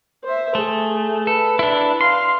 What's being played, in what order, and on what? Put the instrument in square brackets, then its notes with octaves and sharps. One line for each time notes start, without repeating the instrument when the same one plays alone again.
[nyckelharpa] C5 E5
[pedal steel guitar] A3 [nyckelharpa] G#4
[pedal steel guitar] A4 [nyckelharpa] B4
[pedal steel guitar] D4 E4
[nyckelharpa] F5 [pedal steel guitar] C6